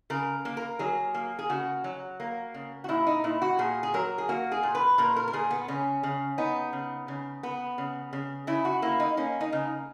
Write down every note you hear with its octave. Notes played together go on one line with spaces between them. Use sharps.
C#3 A#4
A#3
A#4
F#3 G#4
A#3
G#4
C#3 F#4
F#3
A#3
C#3
F#4
A#2 E4
D#4
A#2 E4
F#4
A#2 G#4
G#4
F#3 A#4
G#4
A#3 F#4
G#4
A#2
B4
A#2 A#4
A#4
A#4
A#2 G#4
B3
C#3 C#4
C#3
B3 D#4
C#3
C#3
B3
C#3
C#3
C#3 E4
F#4
A#3 E4
D#4
A#3 C#4
D#4
C#3